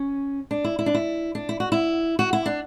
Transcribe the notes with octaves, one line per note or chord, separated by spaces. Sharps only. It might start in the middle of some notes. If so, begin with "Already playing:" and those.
Already playing: C#4
D4
E4
E4
D4
E4
D4
E4
F#4
E4
F#4
E4
D4